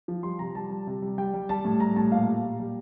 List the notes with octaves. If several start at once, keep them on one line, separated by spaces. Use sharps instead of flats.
F3
G3 C6
C3 A#5
G3 A5
G3
C3
G3
G3 G5
G3
G3 A5
A2
G3 A#5
A2 A5
A#2 F5
G3
A#2
G3